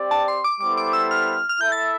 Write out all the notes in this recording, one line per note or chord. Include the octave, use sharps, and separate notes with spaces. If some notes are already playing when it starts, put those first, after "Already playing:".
Already playing: C4 G4 D5
A5
C6
D6
G3 B3 E4 A4 C5 D6
D6
E6
F6
F6
E4 A4 E5 G6
A6